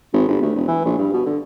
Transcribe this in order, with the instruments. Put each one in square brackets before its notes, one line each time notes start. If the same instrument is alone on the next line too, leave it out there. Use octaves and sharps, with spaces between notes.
[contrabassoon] G#1
G1
D2
E1
E3
A#1
G2
B2
D3